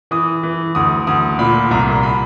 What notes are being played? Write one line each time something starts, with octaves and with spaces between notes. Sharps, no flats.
E3 D#6
E3
D2 D#6
D2 D#6
A#2 B5
C2 A#5
B5